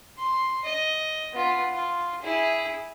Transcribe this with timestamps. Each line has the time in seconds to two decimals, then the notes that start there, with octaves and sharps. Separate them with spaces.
0.19 C6
0.64 D#5
1.33 B3 F4
1.73 F4
2.22 E4 G#4